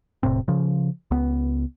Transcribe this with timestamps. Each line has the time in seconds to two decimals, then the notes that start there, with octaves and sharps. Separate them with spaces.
0.23 E1 A2 C3 C4
0.48 C#3 F3
1.11 C#2 B3